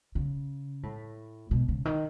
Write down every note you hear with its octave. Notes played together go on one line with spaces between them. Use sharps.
C#3
A2
B2
C#3
D#3